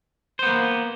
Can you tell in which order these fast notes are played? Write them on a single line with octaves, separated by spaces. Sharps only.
C5 B3 A#3